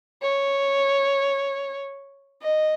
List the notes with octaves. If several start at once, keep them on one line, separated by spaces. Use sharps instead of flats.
C#5
D#5